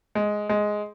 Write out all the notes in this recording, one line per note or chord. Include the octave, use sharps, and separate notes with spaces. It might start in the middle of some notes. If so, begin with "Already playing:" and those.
G#3
G#3